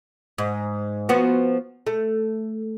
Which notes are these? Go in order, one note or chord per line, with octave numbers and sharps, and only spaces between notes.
G#2
F3 B3 F#4
A3